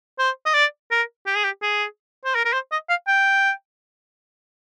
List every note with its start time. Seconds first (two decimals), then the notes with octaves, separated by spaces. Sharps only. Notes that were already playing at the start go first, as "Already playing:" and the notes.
0.19 C5
0.46 D#5
0.54 D5
0.91 A#4
1.26 G4
1.35 G#4
1.44 G4
1.62 G#4
2.25 C5
2.35 A#4
2.45 A#4
2.53 C5
2.72 D#5
2.89 F5
3.07 G5